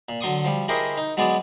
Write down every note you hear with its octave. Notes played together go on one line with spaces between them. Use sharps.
A#2
D3 F#3 C6 C#6 D#6
F3 G3
E4 G4 G#4 A#4 C5 D#5
D#4
F#3 G#3 B3 G#4 D5